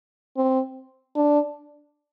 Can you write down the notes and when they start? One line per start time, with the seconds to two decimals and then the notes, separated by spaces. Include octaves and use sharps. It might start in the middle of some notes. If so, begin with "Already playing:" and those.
0.37 C4
1.15 D4